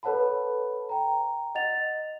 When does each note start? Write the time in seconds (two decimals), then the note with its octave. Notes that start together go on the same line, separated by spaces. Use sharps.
0.03 A4 B4 C#5 F#5 A5 B5
0.89 G5 A#5
1.55 D#5 F#5 A6 F7